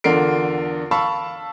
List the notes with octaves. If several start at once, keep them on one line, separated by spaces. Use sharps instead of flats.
E2 D3 F4 A#4 C7 D7
F5 A5 B5 C#6 E6